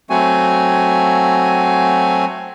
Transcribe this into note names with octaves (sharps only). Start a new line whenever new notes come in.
F#3 A3 C4 F#4 G#5